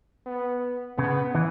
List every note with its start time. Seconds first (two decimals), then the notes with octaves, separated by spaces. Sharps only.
0.26 B3
0.98 C#3 B3
1.35 E3